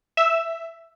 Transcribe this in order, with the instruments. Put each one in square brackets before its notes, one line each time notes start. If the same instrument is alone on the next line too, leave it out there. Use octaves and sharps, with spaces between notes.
[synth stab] E5